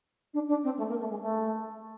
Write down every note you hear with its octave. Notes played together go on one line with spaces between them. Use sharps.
D4
D4
C4
A3
A#3
A3
G#3
A3